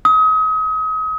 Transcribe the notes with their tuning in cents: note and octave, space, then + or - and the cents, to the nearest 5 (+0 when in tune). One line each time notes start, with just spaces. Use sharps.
D#6 +35